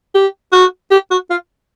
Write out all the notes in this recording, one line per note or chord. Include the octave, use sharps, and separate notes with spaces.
G4
F#4
G4
F#4
F4